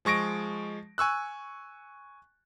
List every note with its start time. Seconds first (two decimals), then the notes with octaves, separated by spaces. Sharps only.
0.05 F3 G#3 C#6 A#6 D7
0.98 G#5 C#6 E6 F#6